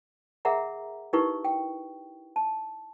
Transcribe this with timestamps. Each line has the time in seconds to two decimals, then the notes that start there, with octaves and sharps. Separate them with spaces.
0.45 G#4 A#4 E5 F#5 A#5
1.13 D#4 E4 G4 A#4 B4 C#6
1.45 G5
2.36 A5